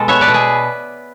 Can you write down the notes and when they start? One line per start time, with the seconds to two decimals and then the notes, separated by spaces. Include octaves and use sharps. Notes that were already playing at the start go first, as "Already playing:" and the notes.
Already playing: B2 G#3 A4
0.08 B3 C#5 E5
0.21 B4 D5
0.28 B2
0.34 G#4 B4